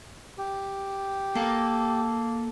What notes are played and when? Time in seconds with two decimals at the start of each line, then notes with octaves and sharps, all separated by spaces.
0.38 G4
1.35 A#3 A4 F5